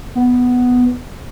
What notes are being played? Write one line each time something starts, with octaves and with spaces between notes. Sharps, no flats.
B3